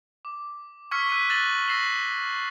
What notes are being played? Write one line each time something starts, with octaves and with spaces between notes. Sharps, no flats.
D6
C#6 E6 F6 G#6 B6 C#7
E6 F#6 B6 D#7
E6 F#6 A6 A#6 E7 F#7
E6 A#6 C7 E7 F#7